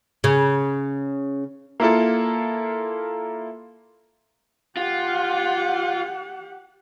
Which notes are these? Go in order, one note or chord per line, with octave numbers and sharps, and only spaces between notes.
C#3
A#3 E4 F4 A4
F4 G4 F#5